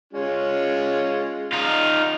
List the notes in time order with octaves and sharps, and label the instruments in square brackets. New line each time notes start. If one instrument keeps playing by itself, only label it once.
[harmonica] G#3 C#4 F4
[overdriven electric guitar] D#4 F4